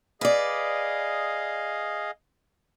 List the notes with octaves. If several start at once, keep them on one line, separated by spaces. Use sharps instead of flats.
G#4 B4 D5 D#5 F5